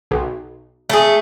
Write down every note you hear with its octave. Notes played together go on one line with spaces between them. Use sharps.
B1
A3 G#4